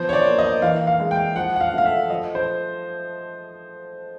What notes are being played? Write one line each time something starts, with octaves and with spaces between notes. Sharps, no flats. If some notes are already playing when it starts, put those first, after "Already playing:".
Already playing: F3 B3 C5
C#5
D5
A#3
D#5
E3 F5
F5
G#3
G5
F3 F#5
F#5
F5
A3 F5
E5
F3 D#5
C5